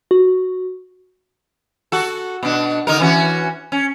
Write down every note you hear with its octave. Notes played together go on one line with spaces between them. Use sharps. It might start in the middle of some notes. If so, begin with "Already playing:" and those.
F#4
F#4 A4
B2 D4
D3 D#4 A#4
E3 C#4 F#4
C#4